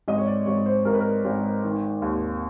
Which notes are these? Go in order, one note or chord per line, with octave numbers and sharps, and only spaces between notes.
G#1 D#5
C#5
D5
G#1 C#5
C5
G#1 A#4
B4
A#4
G#1
D#3
D#2